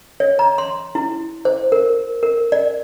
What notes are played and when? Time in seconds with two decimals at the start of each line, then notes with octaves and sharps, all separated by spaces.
0.20 C#5
0.39 A#5
0.58 C6
0.95 E4
1.45 C5
1.72 A#4
2.23 A#4
2.52 D5